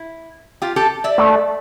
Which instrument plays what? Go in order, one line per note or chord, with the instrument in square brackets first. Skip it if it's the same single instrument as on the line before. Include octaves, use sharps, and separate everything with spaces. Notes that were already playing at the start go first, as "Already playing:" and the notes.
Already playing: [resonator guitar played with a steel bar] E4
F4 G4
G4 A4
D5 E5
[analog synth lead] A3